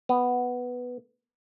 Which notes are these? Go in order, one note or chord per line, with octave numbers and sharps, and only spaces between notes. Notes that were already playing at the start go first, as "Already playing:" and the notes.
B3